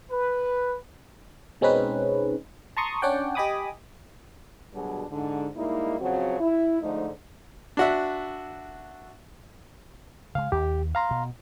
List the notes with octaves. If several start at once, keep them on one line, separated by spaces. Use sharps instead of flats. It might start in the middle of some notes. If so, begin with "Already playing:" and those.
B4
B2 G#3 C4 C#4 D#4 B4
A5 A#5 C6 C#6 D#6
C#4 D4 C#5 D5 F#5 G5
G4 D#5 G#5 B5 D6 D#6
B2 D3 F#3 G3 D4 G#4
G#2 D3
G3 G#3 A#3 D#4 E4
F2 C#3 F#3 C4 F#4
E4
G#2 D3 F3 A3 D#4
D4 F#4 E5
C#3 G#3 F5
D#2 G4
F5 A#5 C6
B2